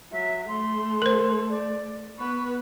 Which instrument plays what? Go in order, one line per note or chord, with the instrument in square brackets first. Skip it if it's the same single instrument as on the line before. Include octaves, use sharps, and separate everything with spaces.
[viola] F#3 [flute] E5
[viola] A3 [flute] C6
[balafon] A#4 C5
[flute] D5
[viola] B3 B4 [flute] C#6